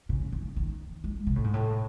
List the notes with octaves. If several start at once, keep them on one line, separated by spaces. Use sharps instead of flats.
C#3
D#3
D#3
G#3
C3
A2
G#2
A2